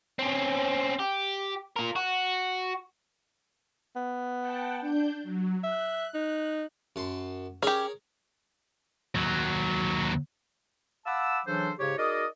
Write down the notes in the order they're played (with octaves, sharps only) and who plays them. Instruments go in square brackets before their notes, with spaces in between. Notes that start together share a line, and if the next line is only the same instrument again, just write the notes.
[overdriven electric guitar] C4 C#4
G4
F4 A#4
F#4
[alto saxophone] B3
[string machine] F#5 G5 A5
D4 G6
F#3
[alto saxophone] E5 [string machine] F#6
[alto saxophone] D#4
[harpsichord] F#2 A5 C6
[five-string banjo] C#4 G4 [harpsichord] G#4 A#4 C#5
[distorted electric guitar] D#2 F#3
[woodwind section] F5 F#5 A5 B5 D6 E6
C#3 E3 F#3 D4 A4 C5
G#2 C#3 G4 C#5
D#4 F#4 G#4 A#4 D5 D#5